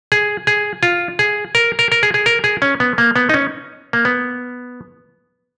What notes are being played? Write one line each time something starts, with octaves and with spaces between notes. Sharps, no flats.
G#4
G#4
F4
G#4
A#4
A#4
A#4
G#4
G#4
A#4
G#4
C#4
B3
A#3
B3
D#4
C#4
A#3
B3